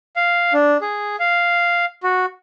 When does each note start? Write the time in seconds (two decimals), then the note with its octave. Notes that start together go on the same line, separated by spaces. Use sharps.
0.16 F5
0.53 D4
0.81 G#4
1.19 F5
2.03 F#4